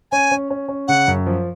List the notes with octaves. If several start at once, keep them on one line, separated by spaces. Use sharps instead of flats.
C#4 G#5
C#4
C#4
C#4
C#3 F#5
F#2
F3